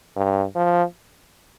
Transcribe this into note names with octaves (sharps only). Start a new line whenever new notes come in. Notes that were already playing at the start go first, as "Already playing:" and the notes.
G2
F3